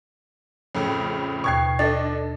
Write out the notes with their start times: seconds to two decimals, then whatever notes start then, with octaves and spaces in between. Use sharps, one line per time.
0.75 F2 A2 C#3
1.44 D#2 B2 C#6 G#6 C7
1.79 D4 A4 D#5 A6